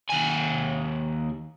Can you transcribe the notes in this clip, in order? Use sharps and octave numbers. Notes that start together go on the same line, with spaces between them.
D#2 G#5